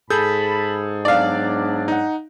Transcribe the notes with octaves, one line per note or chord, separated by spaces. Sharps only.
G#2 G#4 A4 A5 B5 G6
F#3 B3 D4 D5 F5
D#4 F#5